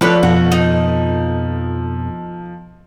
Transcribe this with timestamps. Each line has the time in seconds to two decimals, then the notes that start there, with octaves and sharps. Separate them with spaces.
0.01 F3 D4 A4 B4 C#5
0.23 F2 B2 F#4
0.52 D#4